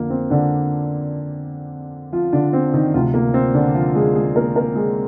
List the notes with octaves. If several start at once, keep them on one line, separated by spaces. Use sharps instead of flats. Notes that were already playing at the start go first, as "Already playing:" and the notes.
Already playing: F2 D3 F3 A#3
C4
D3 D4
F3 F4
D3 D4
C4
D#3 D#4
D2 C3 F3 F4
A#3
C4
D3 D4
F3 F4
G#3 G#4
G#3 G#4
A#3 A#4
A#3 A#4
G#3 G#4